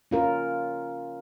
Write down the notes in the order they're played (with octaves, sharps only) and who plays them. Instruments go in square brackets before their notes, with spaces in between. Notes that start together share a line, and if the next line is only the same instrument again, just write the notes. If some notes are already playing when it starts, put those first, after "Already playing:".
[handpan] C#4 F4 A#4